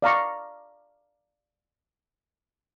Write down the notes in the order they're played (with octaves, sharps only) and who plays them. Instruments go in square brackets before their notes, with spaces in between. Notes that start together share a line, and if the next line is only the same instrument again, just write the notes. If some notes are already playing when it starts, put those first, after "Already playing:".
[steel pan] D5 F5 A#5 C#6